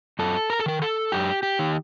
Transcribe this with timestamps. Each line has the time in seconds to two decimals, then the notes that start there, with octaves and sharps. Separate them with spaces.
0.19 F#2 A4
0.50 A#4
0.60 A4
0.66 D#3 A#4
0.82 A4
1.12 F#2 G4
1.43 G4
1.59 D#3